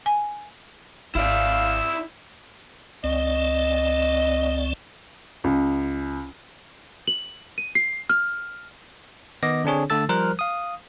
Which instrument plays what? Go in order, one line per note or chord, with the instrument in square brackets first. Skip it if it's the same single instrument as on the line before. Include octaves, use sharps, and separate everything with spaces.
[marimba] G#5
[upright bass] G#1 [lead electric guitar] E4 D5 [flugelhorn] F5 [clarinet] E6
[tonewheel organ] C#2 C4 D5 [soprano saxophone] D#5
[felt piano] C#2
[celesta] F#7
D#7
C7
F6
[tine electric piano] D#3 B3 D#5 D6 A#6
D3 C4 D4 G#4 C#5
D3 A3 A4 E6 A6
F3 G3 A#4 C5 F6 F#6
F5 D#6